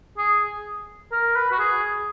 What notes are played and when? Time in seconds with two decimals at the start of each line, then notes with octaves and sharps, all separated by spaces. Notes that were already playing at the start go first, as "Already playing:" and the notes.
0.18 G#4
1.12 A#4
1.36 B4
1.52 F#4
1.59 G#4